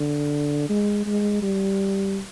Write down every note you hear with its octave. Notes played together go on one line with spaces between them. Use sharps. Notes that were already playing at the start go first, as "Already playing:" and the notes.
Already playing: D3
G#3
G#3
G3